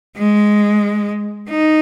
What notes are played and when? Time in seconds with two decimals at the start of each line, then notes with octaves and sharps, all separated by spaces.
0.17 G#3
1.50 D#4